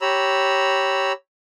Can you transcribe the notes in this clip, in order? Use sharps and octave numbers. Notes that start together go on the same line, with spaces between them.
G4 C#5 A#5 B5 E6